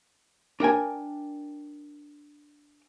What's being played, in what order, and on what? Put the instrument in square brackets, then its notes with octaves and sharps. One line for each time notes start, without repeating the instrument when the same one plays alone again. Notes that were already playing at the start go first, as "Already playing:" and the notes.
[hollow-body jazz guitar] D4 A#4 G5 G#5